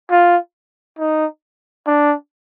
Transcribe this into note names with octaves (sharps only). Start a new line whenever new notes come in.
F4
D#4
D4